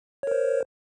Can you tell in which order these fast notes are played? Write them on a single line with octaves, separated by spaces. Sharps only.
C#5 A#4 C5